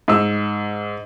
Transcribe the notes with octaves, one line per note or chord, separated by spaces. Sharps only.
G#2 E6